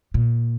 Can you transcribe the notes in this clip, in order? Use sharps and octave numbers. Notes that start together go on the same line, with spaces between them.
A#2